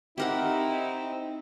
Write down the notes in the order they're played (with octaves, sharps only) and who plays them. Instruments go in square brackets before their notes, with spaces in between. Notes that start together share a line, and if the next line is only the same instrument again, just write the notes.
[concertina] C4 [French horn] D#4 [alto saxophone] E4 [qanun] G4 A#4 F#5